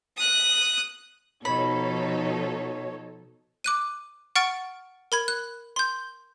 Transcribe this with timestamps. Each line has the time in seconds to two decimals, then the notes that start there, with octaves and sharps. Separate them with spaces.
0.17 D#6 F#6
1.45 B2 F3 D#4 A4 C#5 B5
3.64 D6 F#6 D#7
4.35 F#5 C#6 F6 A6 D7
5.12 A#4 B5 G#6
5.28 F#6
5.76 C6 G6